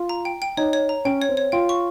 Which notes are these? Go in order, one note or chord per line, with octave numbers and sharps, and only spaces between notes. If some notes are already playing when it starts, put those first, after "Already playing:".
Already playing: F4
A#5
G5
G5
D#4 C#5
C#5
A#5
C#4 G5
C#5
C4
C#5
F4 G5
C#6